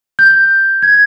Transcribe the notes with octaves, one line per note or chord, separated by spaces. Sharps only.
G6
G#6